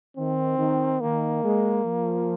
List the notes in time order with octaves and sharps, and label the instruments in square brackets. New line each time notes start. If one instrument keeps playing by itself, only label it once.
[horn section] D#3 [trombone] C4
[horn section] D#3
[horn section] D#3 [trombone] A#3
[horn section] G#3
F3